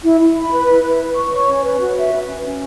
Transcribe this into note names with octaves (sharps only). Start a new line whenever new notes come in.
E4
E4
B5
B4
E4
E4
B4
C#6
C#5
C#4
B4
F#4
E5
B4
C#4
C#4